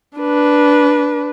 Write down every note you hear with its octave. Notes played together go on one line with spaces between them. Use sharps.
D4 B4